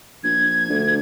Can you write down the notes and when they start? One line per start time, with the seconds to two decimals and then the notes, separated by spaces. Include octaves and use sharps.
0.24 A#1 G#6
0.69 D2